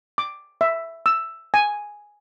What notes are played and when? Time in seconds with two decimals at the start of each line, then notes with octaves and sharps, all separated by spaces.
0.18 D6
0.61 E5
1.06 E6
1.54 G#5